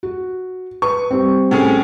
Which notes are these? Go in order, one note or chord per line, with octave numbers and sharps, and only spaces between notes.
F#4
B4 C#6
G3 C4
A2 C#4 G#4